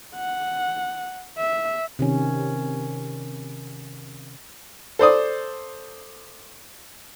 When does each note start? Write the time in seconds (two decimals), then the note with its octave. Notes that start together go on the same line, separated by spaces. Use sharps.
0.15 F#5
1.38 E5
1.99 C3 D#3 C#4
4.99 A4 C5 D5 D#6